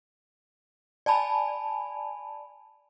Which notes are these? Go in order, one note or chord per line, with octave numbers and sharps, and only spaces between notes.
D5 G#5 A5 B5